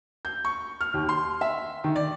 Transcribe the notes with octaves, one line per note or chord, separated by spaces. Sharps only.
G6
C#6
F6
D#2
C6
E5
D#3
D5